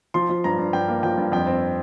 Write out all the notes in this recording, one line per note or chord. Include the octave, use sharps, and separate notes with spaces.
F3 C6
F3
G2 A#5
G2
G2 G5
A#3
F3 G5
G2
F2 G5
C4